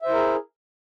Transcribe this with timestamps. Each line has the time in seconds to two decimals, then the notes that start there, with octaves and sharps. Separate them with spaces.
0.02 E5
0.06 C5
0.09 E4
0.12 A#4
0.16 G#4